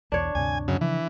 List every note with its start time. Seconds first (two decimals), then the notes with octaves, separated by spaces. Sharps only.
0.12 B1 E2 D4 C#5
0.35 D2 G2 C3 G#5
0.68 F#2 C#3
0.81 C#3 E3 F3